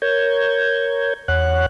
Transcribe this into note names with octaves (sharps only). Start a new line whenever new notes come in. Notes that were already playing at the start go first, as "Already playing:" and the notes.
A#4 C#5 G6 G#6
E2 C#5 F#5 F#6